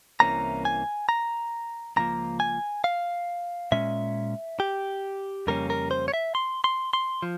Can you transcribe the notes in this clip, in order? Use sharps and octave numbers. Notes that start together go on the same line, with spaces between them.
C2 C3 E3 A#3 C#4 A#5
G#5
A#5
C#2 C3 F3 A#3 A#5
G#5
F5
A#2 G#3 C#4 E5
G4
F2 C#3 G3 A#3 C#4 A#4
A#4
C5
C#5
E5
C6
C6
C6
F3